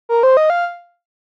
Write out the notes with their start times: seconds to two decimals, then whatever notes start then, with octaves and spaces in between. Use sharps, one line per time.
0.09 A#4
0.23 C5
0.37 D#5
0.50 F5